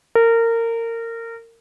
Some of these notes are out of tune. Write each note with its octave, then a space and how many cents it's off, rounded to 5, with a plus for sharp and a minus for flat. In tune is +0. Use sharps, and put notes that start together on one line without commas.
A#4 -25